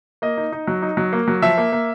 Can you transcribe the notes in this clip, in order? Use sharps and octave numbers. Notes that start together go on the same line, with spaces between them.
A#3 D#5
D#4
D#4
F#3
D#4
F#3
A#3
F#3
F3 E5
A#3
A#3